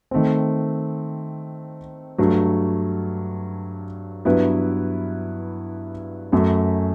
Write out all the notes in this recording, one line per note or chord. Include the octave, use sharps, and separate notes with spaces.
D#3 A3 C4
G2 F#3 A3
G2 F#3 B3 E4 B4
F#2 F#3 A3